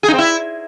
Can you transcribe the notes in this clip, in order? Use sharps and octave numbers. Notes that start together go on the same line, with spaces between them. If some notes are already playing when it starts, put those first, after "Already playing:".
G#4
D#4
C4
E4